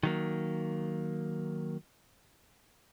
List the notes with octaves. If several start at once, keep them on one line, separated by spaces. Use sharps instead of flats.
D#3 F#3 A#3